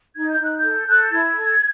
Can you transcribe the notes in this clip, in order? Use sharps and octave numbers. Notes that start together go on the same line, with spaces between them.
D#4 G#6
G6
D#4 F#6
G6
A4
A4 F#6
G6
E4 G#6
A4